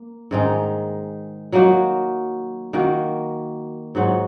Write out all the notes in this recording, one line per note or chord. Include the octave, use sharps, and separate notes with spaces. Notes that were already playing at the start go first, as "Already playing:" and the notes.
Already playing: A#3
G#2 D#3 G#3 D#4
F#3 A#3 D#4 F#4
D#3 A#3 F#4
G#2 F#3 D#4 F#4